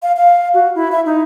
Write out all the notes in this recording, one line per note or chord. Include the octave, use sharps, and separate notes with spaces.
F5
F5
F#4
E4
E5
D#4